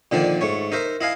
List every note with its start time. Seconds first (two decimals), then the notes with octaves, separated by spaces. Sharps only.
0.11 A#2 D3 D#3 F3 D4
0.41 G#2 A3 C#5
0.72 D#4 A#4 C5 E5
1.01 E4 D#5 F5 G#5